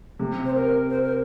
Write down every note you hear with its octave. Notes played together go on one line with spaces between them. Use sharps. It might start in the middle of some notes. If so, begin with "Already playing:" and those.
C3
C5
A#4
C5
A#4